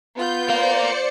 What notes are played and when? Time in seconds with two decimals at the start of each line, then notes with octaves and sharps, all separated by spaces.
0.16 B3 F4 G6
0.49 A#4 C5 D5 F5 C#7